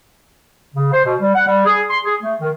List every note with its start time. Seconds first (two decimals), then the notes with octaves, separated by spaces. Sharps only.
0.75 C#3
0.93 C5
1.05 B2
1.21 G3
1.35 F#5
1.47 G3
1.66 G#4
1.90 C6
2.04 G#4
2.22 A3
2.41 D#3